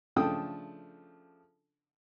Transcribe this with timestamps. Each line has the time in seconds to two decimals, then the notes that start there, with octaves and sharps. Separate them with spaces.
0.16 C#3 F3 A3 D4 G5 D#6